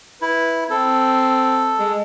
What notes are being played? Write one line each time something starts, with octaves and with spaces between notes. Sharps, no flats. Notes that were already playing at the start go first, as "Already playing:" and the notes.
E4 B4
C4 A4
G#3